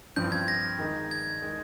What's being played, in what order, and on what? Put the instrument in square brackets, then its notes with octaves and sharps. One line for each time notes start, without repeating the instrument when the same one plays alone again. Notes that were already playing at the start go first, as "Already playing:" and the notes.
[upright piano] G2 F3 C4 [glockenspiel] G6
[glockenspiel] G#6
A#6
[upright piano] D#3 G#3 D#4
[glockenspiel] G#6
[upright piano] D#3 G#3